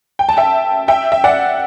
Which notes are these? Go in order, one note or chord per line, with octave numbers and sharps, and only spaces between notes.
G5
A5
E5 G5
E5 G5
E5
D5 F#5